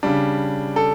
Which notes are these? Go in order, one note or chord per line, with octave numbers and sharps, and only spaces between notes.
C#3 G3 D4
A4